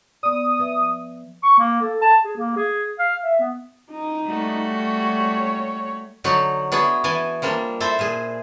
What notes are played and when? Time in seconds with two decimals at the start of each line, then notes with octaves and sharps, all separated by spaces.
0.23 B3 D5 D#6
0.59 F3 B4 E5
1.43 C#6
1.59 A#3
1.81 A4
2.02 A5
2.24 G#4
2.37 A#3
2.56 G#4
2.99 F5
3.24 E5
3.40 B3
3.91 D#4
4.25 G3 A3 F#4
4.75 C#5
6.24 D3 F#3 D#4 F#4
6.72 B3 D4 E4 F#4 G#4
7.04 E3 G#5 A5
7.42 F3 G3 A#3 D4
7.80 E4 A4 C5 E5
7.99 A#2 G#4